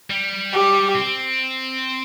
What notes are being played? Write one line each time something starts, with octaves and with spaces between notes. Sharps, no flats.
G3
G4
C4